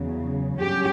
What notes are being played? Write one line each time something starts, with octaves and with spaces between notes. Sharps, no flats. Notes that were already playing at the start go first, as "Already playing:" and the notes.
Already playing: E2 C#3 F#3
G2 F#3 C#4 G4